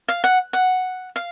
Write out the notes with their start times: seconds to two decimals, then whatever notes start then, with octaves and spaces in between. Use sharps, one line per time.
0.08 F5
0.24 F#5
0.53 F#5
1.16 F5